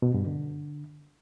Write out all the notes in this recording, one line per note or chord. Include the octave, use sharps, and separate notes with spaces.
B2
G2
D3